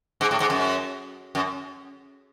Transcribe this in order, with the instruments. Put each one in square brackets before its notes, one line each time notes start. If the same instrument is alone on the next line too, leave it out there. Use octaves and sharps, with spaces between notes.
[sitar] G#2
A2
G#2
F#2
F#2